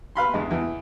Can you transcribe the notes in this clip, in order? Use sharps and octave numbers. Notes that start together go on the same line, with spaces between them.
B4 F5 B5 C6
E2 G2 G#3
E2 E3